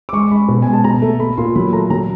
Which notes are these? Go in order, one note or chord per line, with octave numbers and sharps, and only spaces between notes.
D6
G#3 C#6
G#3 B5
B2
G#3 G#5
A5
B2 A#5
A3
A3 B5
A#2 C6
F#3 B5
A3 A#5
F#3 A#5